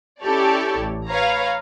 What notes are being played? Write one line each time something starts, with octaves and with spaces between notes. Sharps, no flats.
C#4 E4 G4 A4 C#5 D5
A1
B4 C#5 F5 A#5